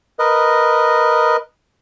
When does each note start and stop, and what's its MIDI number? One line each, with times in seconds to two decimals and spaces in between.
0.19 1.37 70
0.19 1.37 71
0.19 1.37 75